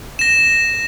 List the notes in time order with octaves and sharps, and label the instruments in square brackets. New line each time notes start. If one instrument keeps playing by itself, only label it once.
[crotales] A#6 E7